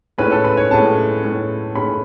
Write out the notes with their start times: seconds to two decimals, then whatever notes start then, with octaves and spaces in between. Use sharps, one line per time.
0.18 A2 G#3 C#4 B4
0.32 A4
0.44 B4
0.57 C#5
0.71 A2 G#3 C#4 A5
1.23 A2 G#3 C#4
1.75 A2 G#3 C#4 B5